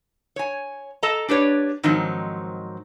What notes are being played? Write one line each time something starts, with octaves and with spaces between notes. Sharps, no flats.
C#5 G#5
A4 D#5 A5 A#5
D4 G4 B4 C#5 D5
G#2 D#3 F3 F#3 C4 D#4